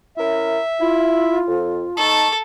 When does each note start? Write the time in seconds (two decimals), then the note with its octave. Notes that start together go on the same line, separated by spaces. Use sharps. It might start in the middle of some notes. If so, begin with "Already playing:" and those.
0.18 C#4 E4 A#4 E5
0.80 E4 F4
1.47 F2
1.97 D#4 A4 A5 C#6